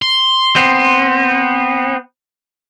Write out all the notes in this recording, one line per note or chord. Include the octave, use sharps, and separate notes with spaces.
C6
B3 C4